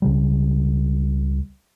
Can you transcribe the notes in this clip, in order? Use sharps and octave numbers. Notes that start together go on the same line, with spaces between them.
C#2 C#3 G3